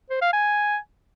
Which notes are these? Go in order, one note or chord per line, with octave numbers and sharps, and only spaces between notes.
C5
F5
G#5